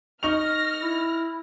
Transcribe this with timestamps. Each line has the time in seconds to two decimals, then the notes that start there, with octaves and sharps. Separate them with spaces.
0.23 D#4 C#6 F6 A#6 F7
0.83 E4